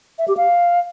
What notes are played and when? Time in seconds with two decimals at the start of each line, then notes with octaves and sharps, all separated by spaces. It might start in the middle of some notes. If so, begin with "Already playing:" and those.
0.19 E5
0.28 G4
0.37 F5